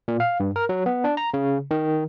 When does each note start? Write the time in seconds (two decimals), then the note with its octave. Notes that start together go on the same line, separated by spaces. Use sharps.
0.08 A#2
0.20 F5
0.40 G2
0.56 A#4
0.69 F#3
0.86 B3
1.04 D4
1.17 A#5
1.34 C#3
1.71 D#3